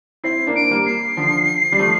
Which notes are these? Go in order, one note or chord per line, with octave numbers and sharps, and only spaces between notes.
C4 E4 C7
A#3 D4
D7
G3 A#3
C7
D3 F3
G3
F3 A3